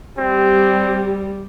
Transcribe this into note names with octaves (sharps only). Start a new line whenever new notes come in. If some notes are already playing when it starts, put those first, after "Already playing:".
G3 C4